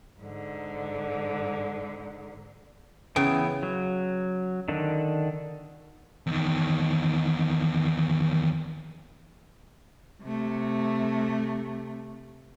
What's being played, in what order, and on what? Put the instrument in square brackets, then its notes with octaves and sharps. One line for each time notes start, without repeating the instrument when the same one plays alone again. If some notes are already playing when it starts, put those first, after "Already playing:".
[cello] G#2 D3
[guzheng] C#3 [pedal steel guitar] E3 B3 G5
[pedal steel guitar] F#3
D3 D#3 D4
[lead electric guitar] E2 D#3
[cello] C3 A3